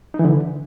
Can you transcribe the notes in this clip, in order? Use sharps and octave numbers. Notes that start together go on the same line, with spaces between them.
D#4
E3
D3